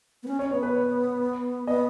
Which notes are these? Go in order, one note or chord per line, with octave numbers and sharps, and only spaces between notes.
B3
C#4
C#4 C#5
B3 C#5
B4
C#5
B3 D#5